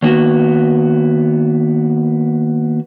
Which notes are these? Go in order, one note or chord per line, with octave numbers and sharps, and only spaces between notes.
D#3 A#3 B3 F#4